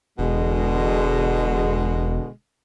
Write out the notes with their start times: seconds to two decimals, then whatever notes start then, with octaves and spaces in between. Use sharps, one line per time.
0.19 E1 B2 D3 G#3